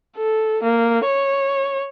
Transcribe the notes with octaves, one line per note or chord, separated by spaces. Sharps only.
A4
A#3
C#5